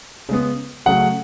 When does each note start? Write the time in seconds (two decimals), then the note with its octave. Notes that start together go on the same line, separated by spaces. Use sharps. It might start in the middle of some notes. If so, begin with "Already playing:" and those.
0.29 C#3 G#3 B3
0.86 C#3 F#3 A3 F#5